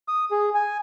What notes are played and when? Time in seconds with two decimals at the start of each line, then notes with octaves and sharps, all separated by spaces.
0.08 D#6
0.31 G#4
0.55 G#5